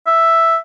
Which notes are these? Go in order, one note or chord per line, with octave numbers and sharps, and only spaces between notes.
E5